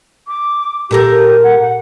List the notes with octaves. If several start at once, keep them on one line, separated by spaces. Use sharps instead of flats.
D6
A#2 G4 A4 A#4
F#5
F#5